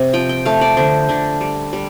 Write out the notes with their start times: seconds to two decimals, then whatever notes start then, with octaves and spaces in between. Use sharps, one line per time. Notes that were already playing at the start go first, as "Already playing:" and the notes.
Already playing: C3
0.13 F3 G5
0.29 G5
0.45 A3 F5
0.61 D5
0.77 D3 C5
1.09 D3 D4
1.41 G3
1.73 G3